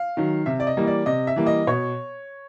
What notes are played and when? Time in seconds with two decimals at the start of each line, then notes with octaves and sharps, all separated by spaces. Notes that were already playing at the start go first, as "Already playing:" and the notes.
Already playing: F5
0.17 D#3 F#3
0.46 C3 E5
0.60 D5
0.67 D#5
0.77 E3 G3 A#3
0.87 D5
1.06 C3 D#5
1.27 E5
1.36 E3 G3 A#3
1.47 D#5
1.67 B2 C#5